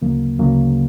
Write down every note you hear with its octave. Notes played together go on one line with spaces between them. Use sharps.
D2 C#3 F#3 A#3
D2 C#3 F#3 A#3